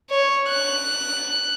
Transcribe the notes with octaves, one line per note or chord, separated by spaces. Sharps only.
C#5
F#6